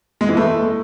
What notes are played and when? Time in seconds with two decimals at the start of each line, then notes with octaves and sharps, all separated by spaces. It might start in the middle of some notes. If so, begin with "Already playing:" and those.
0.21 G#3
0.29 E3
0.37 A3